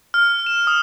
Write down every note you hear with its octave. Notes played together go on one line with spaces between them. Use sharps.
F6
E7
D#6